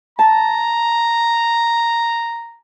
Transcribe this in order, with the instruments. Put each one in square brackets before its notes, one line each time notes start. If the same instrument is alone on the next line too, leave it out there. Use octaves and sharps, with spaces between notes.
[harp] A5 [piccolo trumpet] A#5